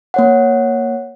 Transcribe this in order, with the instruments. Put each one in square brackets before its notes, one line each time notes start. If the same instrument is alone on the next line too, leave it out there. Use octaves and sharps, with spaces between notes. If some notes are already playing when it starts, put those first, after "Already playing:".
[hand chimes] A#3 C#5 F#5